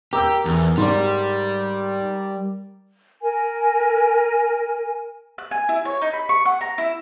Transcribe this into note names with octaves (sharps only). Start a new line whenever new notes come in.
G4 A#4 D6 E6 G6
E2
G#2 G3 D5 C6
A#4 G#5
F#6
G#5
E4
C#5
D#4
B5
C#6
F#5
A#5
E4